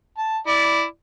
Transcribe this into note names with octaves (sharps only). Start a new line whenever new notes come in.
A5
E4 D5